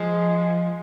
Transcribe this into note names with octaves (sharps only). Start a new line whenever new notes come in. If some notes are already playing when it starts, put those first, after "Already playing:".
Already playing: F3 G#3